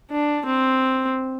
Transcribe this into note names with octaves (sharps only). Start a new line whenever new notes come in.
D4
C4